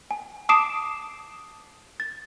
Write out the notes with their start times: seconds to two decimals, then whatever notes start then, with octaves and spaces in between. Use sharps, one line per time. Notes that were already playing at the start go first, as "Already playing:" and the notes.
0.11 G#5
0.49 A5 D6 D#6 C7 D7 E7
2.00 A6